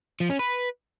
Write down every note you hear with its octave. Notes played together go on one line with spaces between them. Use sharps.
F3
C#4
B4